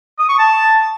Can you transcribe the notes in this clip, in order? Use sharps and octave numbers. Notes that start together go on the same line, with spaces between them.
D#6
C#6
A5